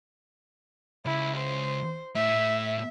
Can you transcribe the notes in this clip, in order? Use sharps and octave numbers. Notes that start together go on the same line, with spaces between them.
C#2 E4
C5
A2 E5